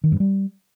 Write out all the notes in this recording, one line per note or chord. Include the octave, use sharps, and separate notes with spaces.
D#3
G2
G3